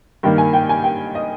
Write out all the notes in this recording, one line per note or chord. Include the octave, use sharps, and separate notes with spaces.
G2 D#3 A#3 G5
G#5
G5
G#5
G5
D#5